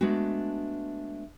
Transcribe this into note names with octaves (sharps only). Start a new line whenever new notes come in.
G#3 A3 B3 D4 F#4